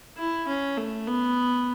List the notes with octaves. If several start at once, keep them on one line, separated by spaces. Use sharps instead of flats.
E4
C#4
A3
B3